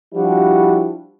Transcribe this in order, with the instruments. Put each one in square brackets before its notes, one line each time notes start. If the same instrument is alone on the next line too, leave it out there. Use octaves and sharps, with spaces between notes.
[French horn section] F3 G3 D4 E4 F#4